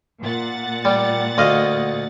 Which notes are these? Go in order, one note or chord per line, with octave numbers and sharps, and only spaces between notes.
A#2 F#5 A6
G3
D2 D#5 F5